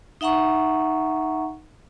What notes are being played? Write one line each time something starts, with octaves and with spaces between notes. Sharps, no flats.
D#4 E5 F#5 A#5 C#6